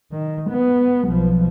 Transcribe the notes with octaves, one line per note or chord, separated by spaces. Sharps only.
D#3
B3
B1 F3